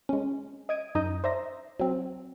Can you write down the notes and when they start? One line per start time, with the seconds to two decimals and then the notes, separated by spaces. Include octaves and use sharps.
0.09 G#3 C#4
0.69 D#5 D#6 G#6 D7 D#7
0.95 F#2 D#4 D#5 D#6 G6
1.24 C5 D5 E5 A#5 A#6
1.79 F#3 C4